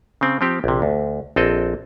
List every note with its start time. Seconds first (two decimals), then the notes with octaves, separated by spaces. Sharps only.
0.21 C#3 C4
0.41 F3 C4 G4
0.64 A#1 C3
0.82 D2
1.36 A#1 C4 A4 D#5